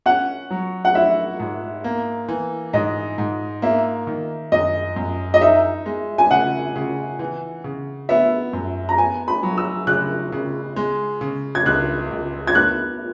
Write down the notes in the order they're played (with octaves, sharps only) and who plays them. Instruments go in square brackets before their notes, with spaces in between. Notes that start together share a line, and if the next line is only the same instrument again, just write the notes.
[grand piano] C#4 [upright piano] F#5
[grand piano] F#3
[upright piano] F#5
[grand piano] E4 [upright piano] E5
[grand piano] G#2
A#3
E3
[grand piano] G#2 [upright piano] D#5
[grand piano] G#2
[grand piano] A#3 [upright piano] E5
[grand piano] D#3
[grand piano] F#2 [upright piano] D#5
[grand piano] F#2
[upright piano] D#5
[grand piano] D#4 [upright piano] E5
[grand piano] G#3
[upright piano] G#5
[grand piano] C#3 [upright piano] F#5
[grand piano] C#3
E3
C#3
[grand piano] B3 [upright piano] E5
[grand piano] F#2
[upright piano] A#5
[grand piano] B3 [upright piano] G#5
[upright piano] B5
[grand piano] F#3
[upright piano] E6
[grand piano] C#3 [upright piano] F#6
[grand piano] C#3
G#3
C#3
[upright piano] G#6
[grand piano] C#2 [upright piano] F#6
[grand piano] C#2
[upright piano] G#6
[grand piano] B3 [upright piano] F#6